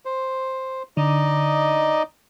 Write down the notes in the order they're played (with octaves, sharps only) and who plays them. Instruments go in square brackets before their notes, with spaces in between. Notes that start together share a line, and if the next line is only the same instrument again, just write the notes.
[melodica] C5
[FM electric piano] D3 [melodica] D#4 D5 D#5